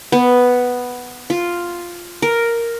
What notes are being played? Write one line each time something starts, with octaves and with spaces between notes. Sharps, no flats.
B3
F4
A#4